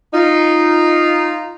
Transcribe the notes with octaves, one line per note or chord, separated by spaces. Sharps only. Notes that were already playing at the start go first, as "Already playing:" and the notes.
D#4 F4